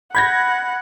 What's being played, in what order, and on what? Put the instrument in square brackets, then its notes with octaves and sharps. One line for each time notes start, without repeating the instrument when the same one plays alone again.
[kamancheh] F#5 [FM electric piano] B5 [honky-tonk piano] G6 G#6 A#6